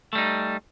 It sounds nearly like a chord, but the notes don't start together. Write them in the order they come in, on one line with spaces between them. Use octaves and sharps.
A3 G3 D#4